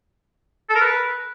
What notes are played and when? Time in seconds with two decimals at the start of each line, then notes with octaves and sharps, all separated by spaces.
0.69 A4
0.75 A#4
0.81 B4